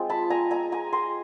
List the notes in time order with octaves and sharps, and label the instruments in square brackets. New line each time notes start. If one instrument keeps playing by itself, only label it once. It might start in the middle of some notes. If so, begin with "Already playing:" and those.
Already playing: [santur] G#3 C4 F4
A5 B5
G#5 A#5
G#5 A#5
G#5 A#5
A#5 C6